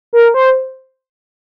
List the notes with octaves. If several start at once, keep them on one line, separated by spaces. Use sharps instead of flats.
A#4
C5